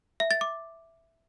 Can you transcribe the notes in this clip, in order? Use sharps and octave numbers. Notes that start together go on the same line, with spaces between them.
E5
A6
D6